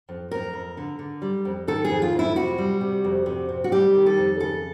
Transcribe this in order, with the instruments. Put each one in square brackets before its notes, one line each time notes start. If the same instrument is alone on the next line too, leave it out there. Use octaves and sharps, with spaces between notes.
[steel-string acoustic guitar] F2
F2 A#4
F2
D3
D3
G3
F2
D#3 A4
G#4
F2
F4
F2
E4
C3 F#4
G3
C3
F2
C3
C3
F#4
G3 G4
D#3
A4
F2
C#3 A4